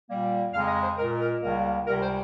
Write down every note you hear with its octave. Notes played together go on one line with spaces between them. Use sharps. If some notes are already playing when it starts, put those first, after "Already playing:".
A#2 G3 A#3
F2 C#3 G#3 F5
D#5
C5
A#2 G#3 A#4
A#4
C#2 C#3 G3 A#3 A#4
C#2 C3 G3 A#4
C5